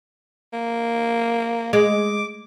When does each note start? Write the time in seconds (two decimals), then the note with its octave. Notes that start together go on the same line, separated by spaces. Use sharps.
0.54 A#3
1.73 G#3 D6